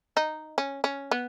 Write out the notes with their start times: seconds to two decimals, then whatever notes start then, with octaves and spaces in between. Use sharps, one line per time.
0.17 D#4
0.58 C#4
0.84 C#4
1.11 B3